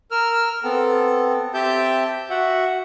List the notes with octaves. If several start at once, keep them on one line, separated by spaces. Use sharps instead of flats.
A#4 E6 F6
B3 C4 A4
C4 G4 E5 G5 A5 G6
F#4 E5 F#5